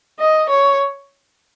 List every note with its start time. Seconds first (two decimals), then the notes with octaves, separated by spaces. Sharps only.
0.19 D#5
0.50 C#5